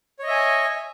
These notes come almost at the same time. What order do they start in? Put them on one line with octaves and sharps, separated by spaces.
C#5 D#5 E5 G#5